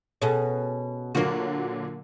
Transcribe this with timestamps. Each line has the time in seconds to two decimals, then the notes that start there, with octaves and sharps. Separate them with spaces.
0.22 B2 C#4 G#4 A4 C#5
1.15 A#2 D3 F#3 A#3 F#4